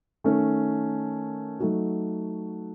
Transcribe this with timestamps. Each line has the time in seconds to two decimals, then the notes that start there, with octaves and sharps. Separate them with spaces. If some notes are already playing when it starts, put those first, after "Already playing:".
0.24 D#3 A3 C#4
1.60 F#3 A3 D#4 F#4